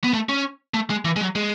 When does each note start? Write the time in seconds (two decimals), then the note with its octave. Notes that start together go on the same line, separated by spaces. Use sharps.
0.04 B3
0.14 A3
0.29 C#4
0.74 A3
0.90 G#3
1.05 E3
1.16 G#3
1.21 F#3
1.35 G#3